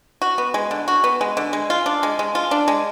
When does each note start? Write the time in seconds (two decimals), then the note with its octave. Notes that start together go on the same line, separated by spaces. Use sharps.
0.22 F#4
0.38 B3
0.54 G#3
0.71 D3
0.88 F#4
1.04 B3
1.21 G#3
1.37 D3
1.53 G#3
1.70 F4
1.86 D4
2.03 G#3
2.19 G#3
2.35 F4
2.51 D4
2.68 G#3